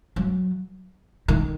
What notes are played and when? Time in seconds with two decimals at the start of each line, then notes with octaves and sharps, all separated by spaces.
0.16 F#3
1.28 D#3